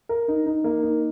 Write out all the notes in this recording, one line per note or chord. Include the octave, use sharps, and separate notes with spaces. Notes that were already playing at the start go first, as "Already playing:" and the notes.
A#4
D#4
D#4
A#3
D#4